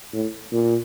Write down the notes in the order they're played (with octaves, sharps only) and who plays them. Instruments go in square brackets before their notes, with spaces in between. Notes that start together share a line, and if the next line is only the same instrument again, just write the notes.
[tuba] A2
A#2